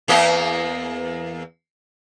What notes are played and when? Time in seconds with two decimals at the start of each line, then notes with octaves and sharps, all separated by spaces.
0.08 E2 A#3 D#5